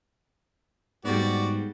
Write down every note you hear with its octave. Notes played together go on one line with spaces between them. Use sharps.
G#2 G3 B3 F#4 D5